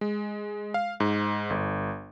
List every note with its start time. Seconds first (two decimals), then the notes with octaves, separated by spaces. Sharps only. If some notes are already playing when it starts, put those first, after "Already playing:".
0.01 G#3
0.74 F5
1.00 G#2
1.50 G1